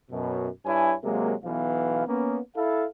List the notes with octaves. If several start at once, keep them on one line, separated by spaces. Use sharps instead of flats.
F#2 B2
G2 E4 C#5 G#5
C3 F#3 G#3 A#3
B1 E3 B3 F5
A#3 B3 C#4
E4 A4 F5